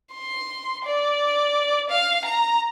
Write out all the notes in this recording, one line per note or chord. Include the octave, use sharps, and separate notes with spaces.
C6
D5
F5
A#5